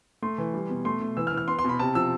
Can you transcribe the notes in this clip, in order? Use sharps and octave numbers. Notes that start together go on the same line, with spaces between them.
A3 C6
E3
G3
B2
A3 C6
A3
E3 E6
F6
E3
F6
B3 C6
C6
B2 B5
C3 A5
F3 E6